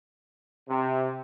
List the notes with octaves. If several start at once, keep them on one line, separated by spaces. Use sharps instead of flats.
C3